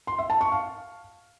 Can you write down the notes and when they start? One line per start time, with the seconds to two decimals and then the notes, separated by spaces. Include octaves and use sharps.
0.07 C6
0.19 E5
0.30 A5
0.41 C#6
0.52 F5